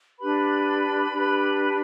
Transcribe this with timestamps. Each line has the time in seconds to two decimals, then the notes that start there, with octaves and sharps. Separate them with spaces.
0.19 D4 G4 B4 B5
1.11 D4 G4 B4